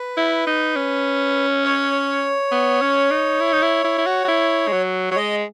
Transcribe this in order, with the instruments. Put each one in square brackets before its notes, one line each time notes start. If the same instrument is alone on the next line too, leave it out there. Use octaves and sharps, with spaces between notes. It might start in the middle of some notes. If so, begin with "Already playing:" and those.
Already playing: [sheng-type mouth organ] B4
[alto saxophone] E4
D#4
C#4
[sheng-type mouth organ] C#5
[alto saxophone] B3
C#4
D#4
E4
D#4
E4
E4
E4
F#4
F#4
E4
G#3
F#3
[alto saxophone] F#3 [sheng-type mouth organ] C#5
[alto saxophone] G#3 [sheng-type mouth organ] D#5